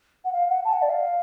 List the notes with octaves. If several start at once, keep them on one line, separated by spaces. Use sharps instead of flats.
F#5
F5
F#5
A5
F#5
D5
F5